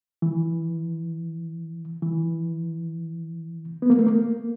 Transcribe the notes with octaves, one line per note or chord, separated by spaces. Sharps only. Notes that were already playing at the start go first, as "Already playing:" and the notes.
E3
E3
B3
A#3
A3
A#3